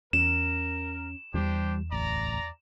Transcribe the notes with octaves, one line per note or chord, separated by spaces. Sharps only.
E2 C#4 A#4 E7
E2 E3 G3 D4 G4 C5
D1 A1 D5 A#5